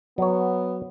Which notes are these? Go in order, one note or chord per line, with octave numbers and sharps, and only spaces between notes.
F#3 B3 C#5